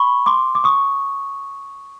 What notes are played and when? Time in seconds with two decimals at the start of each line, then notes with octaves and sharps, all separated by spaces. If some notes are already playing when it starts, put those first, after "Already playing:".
Already playing: B5 C#6
0.26 C6 D6
0.55 D6
0.64 C#6 D#6